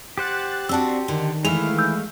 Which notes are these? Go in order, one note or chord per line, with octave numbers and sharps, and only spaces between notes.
G4 C5 F#5 F#6 A6
C4 D4 F#4 A5 E6
D3 D#3
E3 G#3 A3 E4 F5 F7
E6 G6